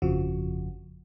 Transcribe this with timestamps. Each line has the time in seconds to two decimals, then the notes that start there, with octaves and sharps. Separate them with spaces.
0.02 G1 F2 C#3 F3 F#4